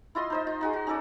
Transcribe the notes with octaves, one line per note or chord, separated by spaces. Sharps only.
E4 F4 D#5 C6
D#4 C5 D#5
F4
D#4 F#4 G#4
F#4
C#4 D#4 A4 D5